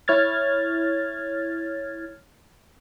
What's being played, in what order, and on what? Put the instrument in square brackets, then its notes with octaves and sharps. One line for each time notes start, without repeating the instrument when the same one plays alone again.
[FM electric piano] E4 C#5 F6 G#6 A6